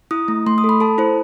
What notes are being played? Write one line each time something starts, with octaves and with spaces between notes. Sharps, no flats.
E4 D#6
A3
A3 C6
D#6
A4
B5
A4 A5
E4 C5